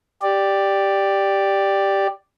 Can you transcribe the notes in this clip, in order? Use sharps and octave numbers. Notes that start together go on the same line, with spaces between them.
G4 D5